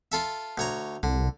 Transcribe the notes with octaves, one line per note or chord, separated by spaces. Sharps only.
F4 A4 E5
D2 C#5 A#5
C2 D3